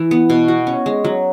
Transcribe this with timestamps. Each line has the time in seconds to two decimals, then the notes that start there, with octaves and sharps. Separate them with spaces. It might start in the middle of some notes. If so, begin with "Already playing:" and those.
Already playing: E3 E4
0.11 B3
0.30 B2
0.48 F#4
0.67 C#4
0.86 G#3
1.05 F#3